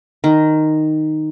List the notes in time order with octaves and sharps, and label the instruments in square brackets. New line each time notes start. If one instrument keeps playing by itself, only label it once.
[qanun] D#3